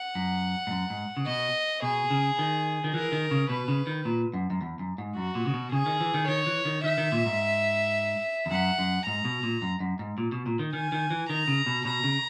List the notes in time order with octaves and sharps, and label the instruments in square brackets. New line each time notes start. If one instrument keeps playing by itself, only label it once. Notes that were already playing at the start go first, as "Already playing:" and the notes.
Already playing: [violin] F#5
[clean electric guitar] F#2
G#2
F#2
G#2
C#3
[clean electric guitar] B2 [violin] D#5
[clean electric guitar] B2 [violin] G#4
[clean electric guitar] C#3
D#3
D#3
[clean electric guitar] E3 [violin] A#4
[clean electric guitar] D#3
C#3
[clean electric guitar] B2 [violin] B4
[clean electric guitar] C#3
D#3
A#2
F#2
F#2
E2
F#2
G#2
[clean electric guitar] F#2 [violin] F#4
[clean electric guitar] A#2
C#3
B2
[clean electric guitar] C#3 [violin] G#4
[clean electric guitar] D#3
E3
D#3
[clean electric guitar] D#3 [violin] C#5
[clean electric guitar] E3
D#3
[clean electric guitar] D#3 [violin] E5
[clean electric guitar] D#3
A#2
G#2
E2
[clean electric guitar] F#2 [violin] F#5
[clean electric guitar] F#2
[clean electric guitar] G#2 [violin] A#5
[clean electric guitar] B2
A#2
F#2
F#2
G#2
A#2
B2
A#2
D#3
[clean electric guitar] D#3 [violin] G#5
[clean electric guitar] D#3
E3
[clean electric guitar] D#3 [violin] A#5
[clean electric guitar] C#3
B2
[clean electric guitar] B2 [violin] A#5
[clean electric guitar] C#3